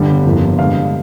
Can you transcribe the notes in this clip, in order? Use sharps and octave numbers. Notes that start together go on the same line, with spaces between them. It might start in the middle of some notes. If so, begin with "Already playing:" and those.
Already playing: G1 G2 D3 G3
G1 F2 C3 F3 A#3
G2 D3 G#3 F5